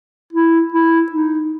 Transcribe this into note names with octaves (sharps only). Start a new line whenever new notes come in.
E4
E4
D#4